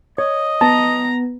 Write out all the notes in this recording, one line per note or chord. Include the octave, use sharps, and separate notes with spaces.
C#5 D#5
B3 A5 A#5